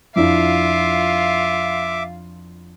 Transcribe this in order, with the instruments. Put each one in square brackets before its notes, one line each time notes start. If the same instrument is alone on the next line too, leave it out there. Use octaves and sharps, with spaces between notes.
[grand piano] F2 D4 E4 [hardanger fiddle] F4 F5 [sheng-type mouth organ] E5 D6